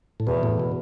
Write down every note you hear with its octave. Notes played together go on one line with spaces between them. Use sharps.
A2
E2 B2
A2
B2